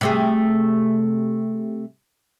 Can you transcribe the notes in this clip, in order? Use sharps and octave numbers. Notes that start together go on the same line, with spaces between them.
C3 A3 G#4